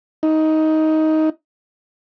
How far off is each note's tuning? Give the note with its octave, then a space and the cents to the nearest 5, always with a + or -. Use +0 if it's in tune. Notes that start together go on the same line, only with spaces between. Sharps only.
D#4 +15